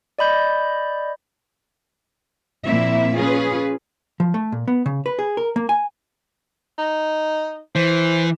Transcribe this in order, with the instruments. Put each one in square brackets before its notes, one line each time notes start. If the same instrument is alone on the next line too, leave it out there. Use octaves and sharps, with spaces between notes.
[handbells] D5 D#5 B5 G6
[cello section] A#2 F3 A#3 C4 E4 E5
C#4 F4 G#4 B4
[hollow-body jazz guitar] F3
A3
A#2
B3
C#3
B4
G#4
A#4
A#3
G#5
[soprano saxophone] D#4
[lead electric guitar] E3 [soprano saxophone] C5